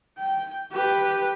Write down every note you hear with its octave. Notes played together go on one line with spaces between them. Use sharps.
G5
G4 B4